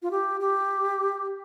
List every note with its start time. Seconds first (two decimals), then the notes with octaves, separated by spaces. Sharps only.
0.02 F4
0.11 G4
0.40 G4